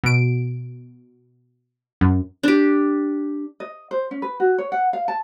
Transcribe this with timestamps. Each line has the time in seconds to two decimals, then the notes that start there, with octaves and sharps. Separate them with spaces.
0.04 B2 D7
2.01 F#2
2.43 D4 G4
3.60 D#5
3.91 C5
4.11 C#4
4.22 B4
4.40 F#4
4.58 C#5
4.72 F#5
4.93 F5
5.08 A5